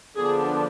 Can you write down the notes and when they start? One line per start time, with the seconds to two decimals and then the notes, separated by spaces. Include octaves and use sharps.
0.17 D3 F3 B3 D4 G#4